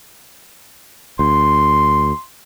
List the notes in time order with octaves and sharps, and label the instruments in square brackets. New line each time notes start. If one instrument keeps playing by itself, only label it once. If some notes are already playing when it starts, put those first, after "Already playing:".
[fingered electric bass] D2 [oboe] C6